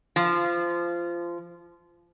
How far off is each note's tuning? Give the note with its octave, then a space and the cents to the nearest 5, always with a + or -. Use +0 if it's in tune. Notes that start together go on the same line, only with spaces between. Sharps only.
F3 -20